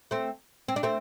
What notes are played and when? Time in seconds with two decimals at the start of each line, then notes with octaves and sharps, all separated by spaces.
0.11 A3 C4
0.68 C4
0.76 D4
0.83 A3 C4